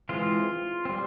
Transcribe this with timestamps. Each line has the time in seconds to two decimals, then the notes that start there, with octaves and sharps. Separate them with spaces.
0.09 E3 G#3 C4 F4
0.85 G3 C4